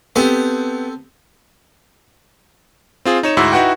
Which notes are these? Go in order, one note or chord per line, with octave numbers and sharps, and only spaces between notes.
B3 C4 G4 A4 C5
C4 F4 G#4
D#4 C#5 E7
D2 G#2 E4 F#4 E6
D#4 E4 F#4 B4 F#5 G5